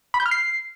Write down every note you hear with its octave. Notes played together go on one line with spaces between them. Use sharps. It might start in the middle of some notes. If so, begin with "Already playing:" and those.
B5
G6
F6
C7